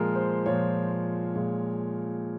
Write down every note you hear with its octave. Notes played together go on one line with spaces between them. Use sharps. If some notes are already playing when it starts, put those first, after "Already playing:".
Already playing: A#2 F3 G#3 A#4
C5
A#2 F3 G#3 C#5
A#2 F3 G#3